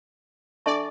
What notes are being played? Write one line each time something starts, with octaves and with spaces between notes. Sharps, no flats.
D4 A4 D5 E5 A5 C#6